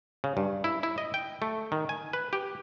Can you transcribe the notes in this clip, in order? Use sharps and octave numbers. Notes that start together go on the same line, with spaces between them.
C#3
G2
E4
E4
D#5
G5
A3
D#3
G#5
B4
G4